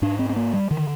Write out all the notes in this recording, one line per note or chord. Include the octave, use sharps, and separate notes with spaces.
G#2 D4
C4
C4
A#3
G3
D3 D#3